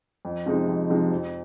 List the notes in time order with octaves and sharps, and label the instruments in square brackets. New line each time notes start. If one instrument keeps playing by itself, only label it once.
[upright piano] F2
C3 F3 G#3 D#4
F2
C3 F3 G#3 D#4
F2